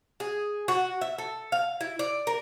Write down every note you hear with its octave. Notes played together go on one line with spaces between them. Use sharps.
G#4
F#4
E5
A4
F5
E4
D5
A#4